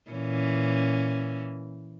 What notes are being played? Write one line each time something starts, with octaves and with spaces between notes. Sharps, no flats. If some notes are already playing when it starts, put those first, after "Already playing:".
A#2 E3 C#4